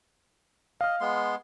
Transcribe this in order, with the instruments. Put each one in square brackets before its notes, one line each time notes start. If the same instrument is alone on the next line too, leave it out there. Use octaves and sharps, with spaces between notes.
[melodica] D#5 [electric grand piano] F5 F6
[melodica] G#3 B3 C6